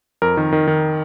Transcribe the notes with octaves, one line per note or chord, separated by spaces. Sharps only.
F2 A#4
D#3
D#3
D#3